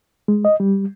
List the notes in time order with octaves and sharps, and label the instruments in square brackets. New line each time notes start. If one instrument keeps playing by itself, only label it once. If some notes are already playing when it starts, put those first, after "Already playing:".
[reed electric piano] G#3
D#5
G3